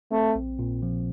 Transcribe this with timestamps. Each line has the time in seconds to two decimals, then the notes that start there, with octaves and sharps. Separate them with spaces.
0.12 A3 C4
0.35 A#1
0.59 A#2
0.82 F3